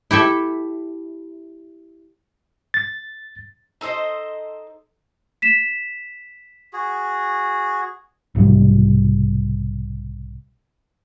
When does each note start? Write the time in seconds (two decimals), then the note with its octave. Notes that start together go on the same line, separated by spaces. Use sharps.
0.11 E4 G4 A4 E5
2.74 A6
3.81 D#4 A4 C5 D#5
5.42 B6 E7
6.73 F#4 G#4
8.35 B1 G#2 C3 G3